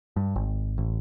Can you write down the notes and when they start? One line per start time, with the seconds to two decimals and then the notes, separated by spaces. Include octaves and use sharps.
0.16 G2
0.36 G#1
0.78 A1